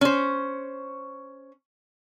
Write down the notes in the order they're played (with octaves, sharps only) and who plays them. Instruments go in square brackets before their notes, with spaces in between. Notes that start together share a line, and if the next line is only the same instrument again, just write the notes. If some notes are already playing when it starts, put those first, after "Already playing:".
[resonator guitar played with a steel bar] C#4 C5